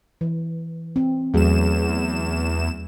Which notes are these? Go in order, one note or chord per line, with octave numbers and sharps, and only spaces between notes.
E3
C4
E2 F#3 A3 G#4 E7